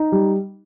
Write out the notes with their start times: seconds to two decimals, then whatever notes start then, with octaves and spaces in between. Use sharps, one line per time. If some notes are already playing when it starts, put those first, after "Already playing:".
Already playing: D#4
0.12 G3